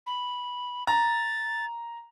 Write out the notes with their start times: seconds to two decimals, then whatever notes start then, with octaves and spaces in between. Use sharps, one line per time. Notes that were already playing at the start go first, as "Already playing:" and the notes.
0.07 B5
0.87 A#5 A6